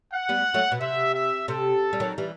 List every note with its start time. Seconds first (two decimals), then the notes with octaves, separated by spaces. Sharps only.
0.12 F#5
0.29 G3 B3
0.54 F#3 A3
0.72 B2
0.81 C3 E5
1.14 E5
1.48 C3 A4
1.93 G3
2.00 D#3 F#3
2.18 E3 G3